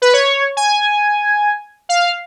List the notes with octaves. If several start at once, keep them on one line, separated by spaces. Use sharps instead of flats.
B4
C#5
G#5
F5